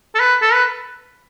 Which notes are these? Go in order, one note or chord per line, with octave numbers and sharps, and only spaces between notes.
A4
B4
A4
B4